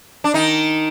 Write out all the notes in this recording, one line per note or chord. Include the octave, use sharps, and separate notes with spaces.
D4
D#3 D#4